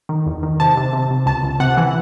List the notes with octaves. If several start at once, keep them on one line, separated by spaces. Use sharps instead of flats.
D#3
E2
D#3
C3 A5
C3
C3
C3
C#2 A5
C#2
C3 F#5
E3